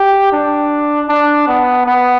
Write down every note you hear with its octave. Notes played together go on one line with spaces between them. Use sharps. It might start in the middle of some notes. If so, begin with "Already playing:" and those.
Already playing: G4
D4
D4
B3
B3